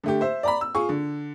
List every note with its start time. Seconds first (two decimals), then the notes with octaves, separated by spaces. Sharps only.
0.04 D3 A3 G4
0.21 C5 E5
0.43 D5 A#5 B5
0.61 E6
0.75 F4 G#4 C#6
0.89 D3